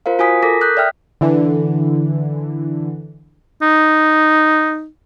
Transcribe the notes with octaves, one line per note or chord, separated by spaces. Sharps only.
F4 A#4 C5 F5
F4 F#4 G#5 D#6 B6
A4 A#4 D6 A#6 B6
D#6 F#6 G6 B6
D5 E5 G5 F6
D3 E3
D#4